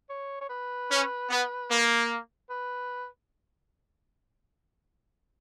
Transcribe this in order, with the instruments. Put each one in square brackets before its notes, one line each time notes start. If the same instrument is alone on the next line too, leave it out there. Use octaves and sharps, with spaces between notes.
[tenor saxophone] C#5
C#5
B4
[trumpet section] C#4
B3
A#3
[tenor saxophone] B4